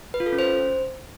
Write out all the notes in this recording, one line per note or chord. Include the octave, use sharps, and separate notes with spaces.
B4
F4
A4
C#4
C5